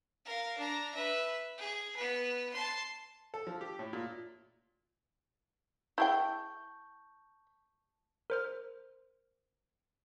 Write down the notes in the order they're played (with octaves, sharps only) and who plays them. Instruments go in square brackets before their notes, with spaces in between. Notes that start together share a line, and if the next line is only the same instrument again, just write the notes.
[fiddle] A#4 F5
D4 A#5
B4 E5
G#4
B3 B4
A5 C6
[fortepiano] A4
F3
G4
A2
A#2
[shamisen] E4 G#4 G5 [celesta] A5 C#6 G6
[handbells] A#4 C5 F6